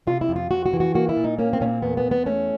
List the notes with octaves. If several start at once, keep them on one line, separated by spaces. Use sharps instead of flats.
C3 F4
E4
F2
F4
F2 F#4
F#4
E3
F#4
A#3 F#4
E4
A#2
D#4
A#3 C#4
C4
A#2 C#4
C4
E2 B3
B3
E2
B3
A3 C#4